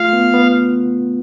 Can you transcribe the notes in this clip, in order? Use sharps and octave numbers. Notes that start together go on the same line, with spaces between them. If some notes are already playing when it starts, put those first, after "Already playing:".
Already playing: A3 F4 F5
B3
B3